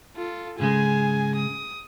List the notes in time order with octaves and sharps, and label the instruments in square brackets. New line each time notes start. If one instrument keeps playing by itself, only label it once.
[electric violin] F4 A4
[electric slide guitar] G#2 C#3 G#3 [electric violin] G#4 G#5
[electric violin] D#6